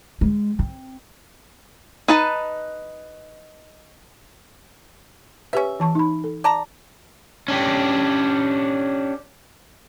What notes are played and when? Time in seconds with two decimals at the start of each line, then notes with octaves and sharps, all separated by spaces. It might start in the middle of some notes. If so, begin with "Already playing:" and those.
0.21 G#3
0.59 C4
2.08 D#4 B4 A5
5.53 C#4 G4 B4 E5
5.80 E3 A5 C#6
5.95 D#4 B5
6.24 A4
6.44 D5 A5 A#5
7.48 C#4 D4 G4